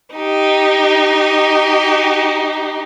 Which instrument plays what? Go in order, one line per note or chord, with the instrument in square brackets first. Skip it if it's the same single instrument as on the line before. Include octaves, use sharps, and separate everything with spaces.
[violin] D#4 G4